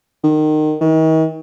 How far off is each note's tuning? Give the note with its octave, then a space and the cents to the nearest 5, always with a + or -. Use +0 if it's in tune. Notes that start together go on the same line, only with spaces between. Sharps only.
D#3 -20
D#3 +40